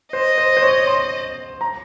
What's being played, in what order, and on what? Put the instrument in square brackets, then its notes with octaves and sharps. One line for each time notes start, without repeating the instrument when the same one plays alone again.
[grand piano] C5 [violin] D#5
[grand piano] C5
C5
C#5
C6
A#5